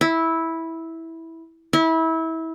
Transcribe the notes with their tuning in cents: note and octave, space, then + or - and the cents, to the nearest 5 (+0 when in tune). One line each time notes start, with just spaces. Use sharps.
E4 -10
E4 -25